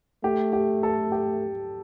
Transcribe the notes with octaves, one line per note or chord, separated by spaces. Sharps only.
A3 G4
G4
A4
G4